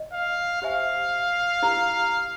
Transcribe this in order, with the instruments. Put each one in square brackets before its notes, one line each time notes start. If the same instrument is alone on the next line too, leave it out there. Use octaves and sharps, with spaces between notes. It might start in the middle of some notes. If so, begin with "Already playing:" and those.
Already playing: [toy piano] D#5
[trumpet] F5
[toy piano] G4 C5 E5 G#5 C#6 [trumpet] F5
[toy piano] E4 G4 A#4